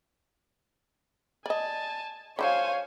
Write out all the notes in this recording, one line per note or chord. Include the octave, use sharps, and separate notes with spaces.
D5 D#5 G#5 A5
D3 F#3 A4 C5 C#5 F5 G#5